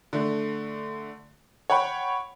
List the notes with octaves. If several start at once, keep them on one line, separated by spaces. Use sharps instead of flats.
D3 A3
C#5 F#5 G5 B5